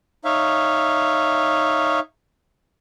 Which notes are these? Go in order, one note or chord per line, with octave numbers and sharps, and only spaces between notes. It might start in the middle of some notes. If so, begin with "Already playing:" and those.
D#4 C#5 E5 F5